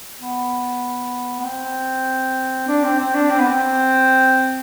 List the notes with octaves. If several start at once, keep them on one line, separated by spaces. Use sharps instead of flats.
B3
B3
C4
D4
C4
C4
D4
C4
B3
C4